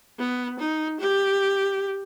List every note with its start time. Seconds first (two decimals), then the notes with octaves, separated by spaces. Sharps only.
0.19 B3
0.59 D#4
1.00 G4